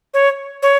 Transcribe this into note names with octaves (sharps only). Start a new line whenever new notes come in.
C#5
C#5